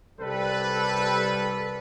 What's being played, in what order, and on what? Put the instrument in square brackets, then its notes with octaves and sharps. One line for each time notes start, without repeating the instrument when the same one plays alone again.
[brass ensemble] C2 G3 A4 B4